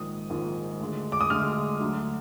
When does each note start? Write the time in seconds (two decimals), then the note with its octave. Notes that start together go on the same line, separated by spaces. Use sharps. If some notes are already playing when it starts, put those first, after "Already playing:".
Already playing: A#1 G#2 D#3 D#6
0.30 A#1 G#2 D#3
0.79 D2 D3 G#3
1.12 D6
1.21 D#6
1.30 D2 D3 G#3 F6
1.80 D2 D3 F#3